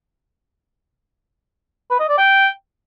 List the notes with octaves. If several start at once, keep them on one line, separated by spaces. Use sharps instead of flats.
B4
D#5
D5
G5